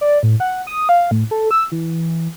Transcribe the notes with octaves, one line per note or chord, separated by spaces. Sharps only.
D5
A2
F#5
D#6
F5
A2
A4
E6
E3